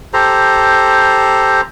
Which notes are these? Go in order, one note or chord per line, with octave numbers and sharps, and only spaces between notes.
G4 A4 C5 A#5